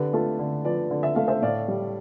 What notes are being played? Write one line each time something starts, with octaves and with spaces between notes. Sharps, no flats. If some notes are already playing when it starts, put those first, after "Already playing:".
Already playing: D3 G4 B4
A3 F4 A4
D3
F3 B4 D5
D3
E5
A3 F5
C5 E5
A2 D5 F5
G3